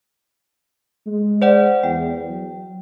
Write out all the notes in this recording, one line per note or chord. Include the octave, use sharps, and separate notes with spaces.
G#3
C5 D5 F#5
E2 G5
F#3